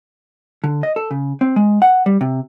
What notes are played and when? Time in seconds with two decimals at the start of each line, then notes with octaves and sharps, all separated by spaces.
0.64 D3
0.83 D#5
0.96 A4
1.11 C#3
1.41 C4
1.56 G#3
1.82 F#5
2.06 G3
2.21 C3